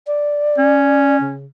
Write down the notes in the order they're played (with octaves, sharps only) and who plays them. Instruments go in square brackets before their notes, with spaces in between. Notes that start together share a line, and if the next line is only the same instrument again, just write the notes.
[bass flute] D5
[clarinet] C#4
[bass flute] C#3